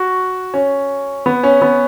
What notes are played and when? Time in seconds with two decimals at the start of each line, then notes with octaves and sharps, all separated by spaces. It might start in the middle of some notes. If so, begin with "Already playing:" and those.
Already playing: F#4
0.54 C#4
1.26 B3
1.43 C#4
1.62 B3